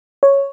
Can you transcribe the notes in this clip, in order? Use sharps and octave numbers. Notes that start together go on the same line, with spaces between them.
C#5